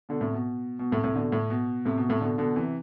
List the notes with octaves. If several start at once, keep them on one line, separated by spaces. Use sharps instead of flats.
B2 D3
A2 C3
B2
B2
A2 C3
A2 C3
B2 D3
A2
B2
A2 C3
B2
A2 C3
B2 D3
B2 D3
C3 E3